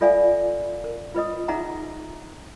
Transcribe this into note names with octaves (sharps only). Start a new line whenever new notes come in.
F4 A4 D5 E5 F5 G#5
A#4
F4 B4 D#5 D#6
D#4 G#4 E5 F#5 A#5